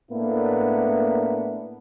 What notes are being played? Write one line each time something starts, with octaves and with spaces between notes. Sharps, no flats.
A2 A#3 B3 D4 E4